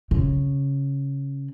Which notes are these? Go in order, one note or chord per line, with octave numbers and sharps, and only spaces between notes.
C#3